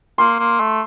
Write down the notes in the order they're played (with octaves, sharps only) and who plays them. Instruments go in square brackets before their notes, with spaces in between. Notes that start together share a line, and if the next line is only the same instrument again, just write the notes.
[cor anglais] A#3 [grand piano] C6
[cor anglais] A#3
A3